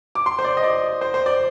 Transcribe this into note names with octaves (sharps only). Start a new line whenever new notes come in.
D6
C6
C5
D5
D#5
D5
C5
C5
D5